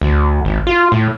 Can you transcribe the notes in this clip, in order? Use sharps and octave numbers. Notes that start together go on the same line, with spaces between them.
D2
G#1
F4
A2